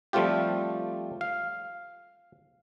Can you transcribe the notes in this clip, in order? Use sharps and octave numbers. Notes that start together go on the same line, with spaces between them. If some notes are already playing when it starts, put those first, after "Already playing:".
F3 G3 A3 C4 F4 G4
F5